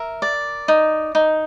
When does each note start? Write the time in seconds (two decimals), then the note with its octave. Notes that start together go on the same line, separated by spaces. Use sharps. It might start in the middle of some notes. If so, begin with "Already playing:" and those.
Already playing: A#4 E5
0.22 D5
0.68 D#4
1.15 D#4